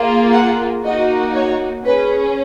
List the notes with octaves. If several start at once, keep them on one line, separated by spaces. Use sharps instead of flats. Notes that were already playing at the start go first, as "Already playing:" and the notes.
Already playing: A#3 F4 G#4
F#5
A#3 D#4 F#4 D#5
C#5
C#4 G#4 B4